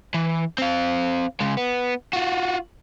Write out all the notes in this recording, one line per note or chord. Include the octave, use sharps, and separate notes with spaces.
E3
C4 F5
C#3 G#3
B3
F4 F#4